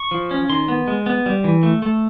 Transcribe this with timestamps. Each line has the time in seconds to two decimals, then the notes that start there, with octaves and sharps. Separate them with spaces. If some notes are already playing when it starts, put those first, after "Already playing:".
Already playing: C#6
0.11 F3
0.31 C#4
0.49 D#3 C6
0.68 B3
0.88 G#3
1.06 B3
1.26 G3
1.44 E3
1.63 A3
1.82 A3